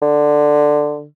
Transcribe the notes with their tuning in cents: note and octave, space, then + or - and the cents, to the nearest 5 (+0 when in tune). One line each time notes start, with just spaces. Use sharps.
D3 +10